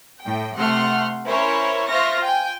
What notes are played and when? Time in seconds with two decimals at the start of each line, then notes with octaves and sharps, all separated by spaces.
0.23 A2 G5
0.56 C3 A3 F#5 C6 F6
1.27 C#4 E4 A#4 C5 C#5
1.89 F4 C5 E5 C#6 F6 A#6
2.22 G5 G#5